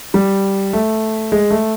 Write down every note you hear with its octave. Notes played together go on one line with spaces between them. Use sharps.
G3
A3
G#3
A3